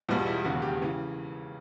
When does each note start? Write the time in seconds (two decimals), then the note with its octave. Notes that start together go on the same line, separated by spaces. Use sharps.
0.09 E1 E2 B2 G3 F4
0.26 E4
0.44 E1 D#2 C#3 F#4
0.62 G4
0.82 C#3 E3